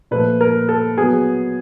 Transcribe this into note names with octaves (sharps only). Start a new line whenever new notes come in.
A#2 F3 A3 B4
A#4
A4
F#3 B3 G#4